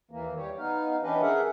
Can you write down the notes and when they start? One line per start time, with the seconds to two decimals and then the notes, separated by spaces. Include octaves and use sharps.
0.11 D#2 E3 A#3
0.37 G3 G4 C#5
0.58 B3 D#4 F5
1.03 E3 C#4 D4 G4 B4 D#5
1.21 G#4 A#4 E5 F#5